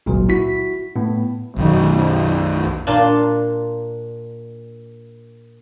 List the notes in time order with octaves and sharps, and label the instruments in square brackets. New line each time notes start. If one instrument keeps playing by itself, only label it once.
[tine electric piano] G#1 C#2 A#2 F#3
E4 F#4 B6
A2 B3
[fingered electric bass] B1 F#2 D#3
[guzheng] A#2 A#3 D4 F5 A5 C6